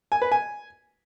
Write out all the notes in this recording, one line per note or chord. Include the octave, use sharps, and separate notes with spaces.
G#5
B4
G#5